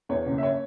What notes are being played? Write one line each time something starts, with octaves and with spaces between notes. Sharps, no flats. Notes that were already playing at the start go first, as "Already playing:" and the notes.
E2 C#5
F#1
E5
C#5